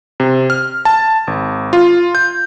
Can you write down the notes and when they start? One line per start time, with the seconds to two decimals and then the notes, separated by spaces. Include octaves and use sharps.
0.20 C3
0.50 F6
0.85 A5
1.27 G#1
1.73 F4
2.15 G6